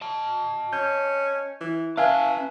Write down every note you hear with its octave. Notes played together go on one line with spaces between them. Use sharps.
D#5 A5
C#4 G6
E3
C#4 B4 E5 F5 G#5 A5